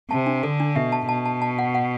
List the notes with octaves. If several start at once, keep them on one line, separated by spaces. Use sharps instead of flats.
C3 A5
D4
D3 A4
D4
B2 E5
A5
B2 A5
A5
A5
F#5
F#5